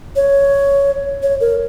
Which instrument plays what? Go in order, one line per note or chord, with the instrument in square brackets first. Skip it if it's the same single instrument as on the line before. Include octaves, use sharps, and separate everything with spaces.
[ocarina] C#5
C#5
A#4